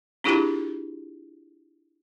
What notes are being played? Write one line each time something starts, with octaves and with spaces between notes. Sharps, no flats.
C4 D4 E4 F4 G4 G#4